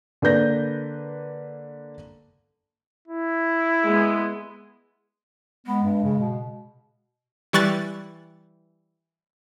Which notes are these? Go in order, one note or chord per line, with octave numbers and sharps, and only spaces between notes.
D3 A#3 B4 G6 A#6
E4
G#3 B3
G#3 B3
G2
C#3
B2
E3 G3 C#6 F#6 A6